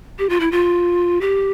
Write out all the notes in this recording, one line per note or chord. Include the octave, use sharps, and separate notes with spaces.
G4
F4
E4
F4
G4